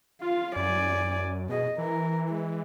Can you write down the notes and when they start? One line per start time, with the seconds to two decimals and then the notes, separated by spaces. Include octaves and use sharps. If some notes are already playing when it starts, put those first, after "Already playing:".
0.21 F4 F5
0.56 F#2 D5 G#5
1.49 B2 G#4 D#5
1.78 E3 A#4
2.29 G#3